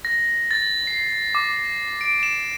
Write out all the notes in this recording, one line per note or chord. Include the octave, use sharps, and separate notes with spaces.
A#6
A6
C7
D6
D7
E7